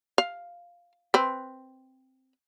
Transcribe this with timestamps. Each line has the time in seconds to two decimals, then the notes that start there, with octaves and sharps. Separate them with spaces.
0.18 F5
1.14 C4 B4